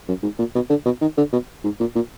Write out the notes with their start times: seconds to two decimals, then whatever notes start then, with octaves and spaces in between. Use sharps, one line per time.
0.08 F#2
0.23 G#2
0.39 A#2
0.55 B2
0.70 D3
0.86 B2
1.01 D#3
1.18 D3
1.33 B2
1.64 G#2
1.80 A#2
1.95 A#2